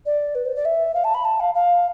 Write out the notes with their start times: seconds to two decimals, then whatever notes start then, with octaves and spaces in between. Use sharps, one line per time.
0.06 D5
0.35 B4
0.45 C5
0.56 D5
0.65 E5
0.94 F5
1.04 A5
1.14 B5
1.25 A5
1.40 F5
1.54 F5